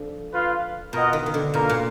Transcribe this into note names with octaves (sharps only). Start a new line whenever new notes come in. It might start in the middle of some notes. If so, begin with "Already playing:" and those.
Already playing: D3 F3
F4 B4 F5
B2 F4 A#4 D#5 F#5
D#3
D#3
D3
B2 A#3 F4 A#4
A#2